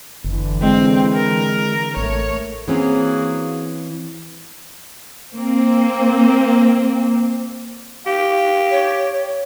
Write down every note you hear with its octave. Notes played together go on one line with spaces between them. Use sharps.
F#1 D3 E3
G#3 C4
A#4
A1 A3 C#5
E3 A#3 C4 C#4 F#4 G#4
A#3 C4
G4 F5
C#5